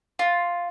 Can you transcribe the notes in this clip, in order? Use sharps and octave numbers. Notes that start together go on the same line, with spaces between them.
F4